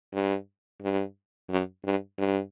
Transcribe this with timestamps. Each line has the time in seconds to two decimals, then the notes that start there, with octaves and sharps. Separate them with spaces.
0.14 G2
0.82 G2
1.50 F#2
1.85 G2
2.18 G2